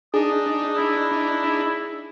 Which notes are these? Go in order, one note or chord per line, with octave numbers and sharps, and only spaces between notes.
D4 D#4 G#4 D#6
E4